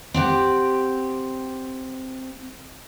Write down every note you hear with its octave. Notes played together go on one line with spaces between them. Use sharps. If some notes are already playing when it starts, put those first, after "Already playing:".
C4 G4 F#5